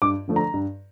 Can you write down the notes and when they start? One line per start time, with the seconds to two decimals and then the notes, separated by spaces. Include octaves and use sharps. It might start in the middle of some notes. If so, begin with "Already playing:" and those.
0.02 G2 D6
0.28 D3 F3 A3 D4
0.36 A#5
0.54 G2